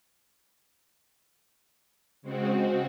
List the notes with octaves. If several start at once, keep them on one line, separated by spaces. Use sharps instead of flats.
C#3 G#3 C4 F#4